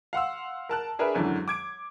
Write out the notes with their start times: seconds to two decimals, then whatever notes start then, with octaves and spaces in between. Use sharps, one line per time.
0.13 F5 F#5 C6 E6
0.69 A#4 A5 F#6
0.99 D4 G#4 A#4 B4 E5
1.14 G#1 F#2 D3 E3
1.48 D6 G#6 D7